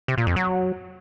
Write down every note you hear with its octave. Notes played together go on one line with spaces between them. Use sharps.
C3
A#2
F2
F#3